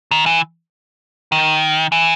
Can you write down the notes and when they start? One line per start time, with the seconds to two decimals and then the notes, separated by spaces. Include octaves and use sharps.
0.11 D#3
0.26 E3
1.32 D#3
1.92 E3